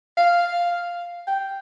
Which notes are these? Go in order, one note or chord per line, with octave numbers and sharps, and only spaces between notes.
F5
G5